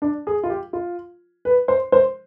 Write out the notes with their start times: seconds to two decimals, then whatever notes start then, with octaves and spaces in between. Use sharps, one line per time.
0.02 D4
0.27 G#4
0.43 F4
0.50 G4
0.73 F4
1.45 B4
1.68 C5
1.92 C5